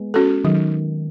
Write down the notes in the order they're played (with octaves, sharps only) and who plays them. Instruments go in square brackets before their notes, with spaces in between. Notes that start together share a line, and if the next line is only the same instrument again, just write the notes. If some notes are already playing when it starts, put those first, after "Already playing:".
Already playing: [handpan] G#3 B3
[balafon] C#4 F#4 A4
[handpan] D#3 [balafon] F#3